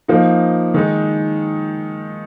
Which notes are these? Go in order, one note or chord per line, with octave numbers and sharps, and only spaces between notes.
F3 A#3 D#4
D#3 G#3 D#4